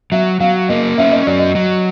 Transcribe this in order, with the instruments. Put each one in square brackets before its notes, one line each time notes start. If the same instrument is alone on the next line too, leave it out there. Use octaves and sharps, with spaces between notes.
[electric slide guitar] F#3 [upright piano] E5
[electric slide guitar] F#3 [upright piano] F5
[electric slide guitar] A#3 [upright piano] D#5
[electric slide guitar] C#4 [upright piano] E5
[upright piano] D#5
[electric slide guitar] F#3 [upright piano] D5
[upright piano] D#5
[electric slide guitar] F#3